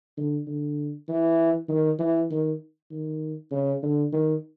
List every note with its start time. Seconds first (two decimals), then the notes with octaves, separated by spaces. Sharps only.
0.18 D3
0.47 D3
1.09 E3
1.69 D#3
1.99 E3
2.31 D#3
2.91 D#3
3.52 C#3
3.83 D3
4.13 D#3